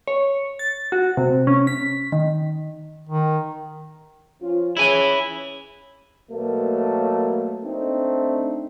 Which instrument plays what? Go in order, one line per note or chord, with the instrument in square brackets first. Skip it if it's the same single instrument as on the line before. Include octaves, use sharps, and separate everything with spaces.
[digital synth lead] C#5
A6
F#4
C3
C#4
B6
D#3
[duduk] D#3
[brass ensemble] F3 C#4 F4
[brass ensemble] C#4 G#4 C#5 [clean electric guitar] E4 G#5
[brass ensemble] B2 F#3 A3 A#3
A3 C4 D4 D#4